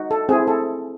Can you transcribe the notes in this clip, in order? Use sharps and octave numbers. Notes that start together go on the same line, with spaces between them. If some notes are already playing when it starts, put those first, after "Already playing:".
Already playing: D#4 F#4
A4
C4 E4 G#4
A4